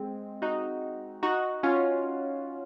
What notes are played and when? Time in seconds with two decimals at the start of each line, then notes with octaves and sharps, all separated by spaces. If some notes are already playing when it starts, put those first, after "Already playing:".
Already playing: G#3 C4
0.42 D#4 F#4
1.23 D#4 F#4
1.63 C#4 F4